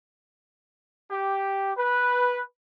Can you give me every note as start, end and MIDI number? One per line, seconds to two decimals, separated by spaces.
1.10 1.71 67
1.77 2.41 71